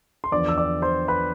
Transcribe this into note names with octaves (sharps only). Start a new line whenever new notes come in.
C6
E2 D3 F3 D5 D6
E6
D5 D6
C5 C6
B4 B5